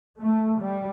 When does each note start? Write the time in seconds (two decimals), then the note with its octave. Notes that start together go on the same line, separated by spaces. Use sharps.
0.20 A3
0.60 G3